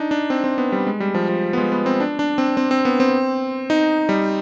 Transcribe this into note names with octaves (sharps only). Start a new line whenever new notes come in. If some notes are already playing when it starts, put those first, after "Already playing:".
Already playing: D4 D#4
D4
C4
C4
B3
G3
G#3
G3
F3
F3
B3
G#3
B3
C4
D4
D4
C4
C4
C4
B3
C4
D#4
G3